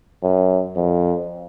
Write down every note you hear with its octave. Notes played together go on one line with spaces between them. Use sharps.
F#2
F2